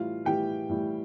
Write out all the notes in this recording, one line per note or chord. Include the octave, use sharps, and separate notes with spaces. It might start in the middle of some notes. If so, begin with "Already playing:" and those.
Already playing: A2 E3 G3 F4 F5
A2 E3 G3 G4 G5
A2 E3 G3